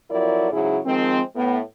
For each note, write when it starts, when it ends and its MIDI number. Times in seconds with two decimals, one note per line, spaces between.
0.10 0.48 41
0.10 0.48 53
0.10 0.48 54
0.10 0.48 64
0.10 0.48 70
0.10 0.48 74
0.51 0.78 44
0.51 0.78 49
0.51 0.78 54
0.51 0.78 64
0.51 0.78 68
0.86 1.20 51
0.86 1.20 53
0.86 1.20 56
0.86 1.20 60
1.36 1.59 45
1.36 1.59 59